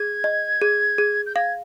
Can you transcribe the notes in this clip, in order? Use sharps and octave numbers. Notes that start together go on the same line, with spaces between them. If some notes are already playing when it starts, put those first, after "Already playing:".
Already playing: G#4 G#6
D#5
G#4
G#4
G6
F5 G#6